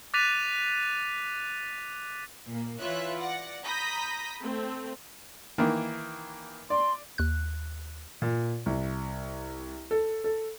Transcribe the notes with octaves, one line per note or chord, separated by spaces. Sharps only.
D6 F#6 A6 B6 D#7 F7
A#2 A#3
E3 E4 F4 C#5 E5 F#6
D5 F#5 A#6
A#5 B5 D#6 G6 A#6 B6
A3 C4
D#3 E3 A#3
D5 C6
D#2 F#6
A#2
C2
A4
A4